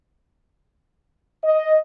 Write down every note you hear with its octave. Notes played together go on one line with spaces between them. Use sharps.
D#5